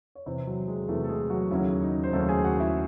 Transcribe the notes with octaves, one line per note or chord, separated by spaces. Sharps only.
C#5
E2 C3 E3 C4 C5
F#3 F#4
G#3 G#4
G#4
E2 C3 E3 A3 A4
A4
G#3 G#4
F#3 F#4
D#2 C#3 F#3 E4
D#4
C5
D#2 C#3 F#3 A3 A4
G#4 G#5
F#4 F#5
E4 E5